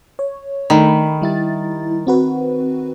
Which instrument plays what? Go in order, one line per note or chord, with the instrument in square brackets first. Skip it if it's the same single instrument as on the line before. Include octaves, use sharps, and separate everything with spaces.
[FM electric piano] C#5
[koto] D#3 [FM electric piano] A3 D4 B5
[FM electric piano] G3 E4 A6
C4 F#4 B4